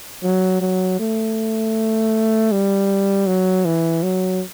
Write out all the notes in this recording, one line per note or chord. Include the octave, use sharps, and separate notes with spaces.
F#3
F#3
A3
G3
F#3
E3
F#3